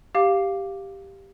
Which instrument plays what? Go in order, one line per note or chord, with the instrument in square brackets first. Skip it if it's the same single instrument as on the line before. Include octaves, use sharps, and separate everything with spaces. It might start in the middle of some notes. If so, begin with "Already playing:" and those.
[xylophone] G4 F5 D6